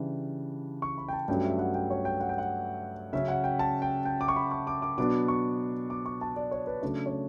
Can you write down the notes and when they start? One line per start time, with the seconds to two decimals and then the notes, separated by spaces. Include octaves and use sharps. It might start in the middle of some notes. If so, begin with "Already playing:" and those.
Already playing: C#3 E3 G3 D4
0.82 C#6
0.98 B5
1.09 G5
1.13 A5
1.28 G2 F#3 A3 C#4 G5
1.44 E5
1.59 F#5
1.75 G5
1.90 C#5
2.05 G5
2.20 F#5
2.29 G5
2.38 F#5
3.13 C#3 F#3 C#4 E5
3.28 F#5
3.44 G5
3.59 A5
3.82 G5
4.05 G5
4.21 D6
4.28 C#6
4.36 B5
4.51 C#6
4.67 D6
4.82 D6
4.98 B2 F#3 B3 D4 D6
5.28 C#6
5.90 D6
6.06 C#6
6.21 A5
6.36 D5
6.51 C#5
6.67 B4
6.82 C#3 F#3 A3 D4
7.06 C#5